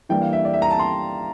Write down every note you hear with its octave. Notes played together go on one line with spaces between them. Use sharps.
E3 G3 A#3 D4 G5
F5
E5
D5
E5
A#5
A5
C6